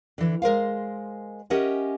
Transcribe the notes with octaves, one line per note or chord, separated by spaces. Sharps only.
D3 E3
G#3 A#4 C5 F5
C#4 G4 A#4 D#5 E5 F#5